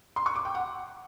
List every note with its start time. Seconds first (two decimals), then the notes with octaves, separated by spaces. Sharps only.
0.16 C6
0.26 C#6
0.36 D6
0.45 G5
0.55 F#5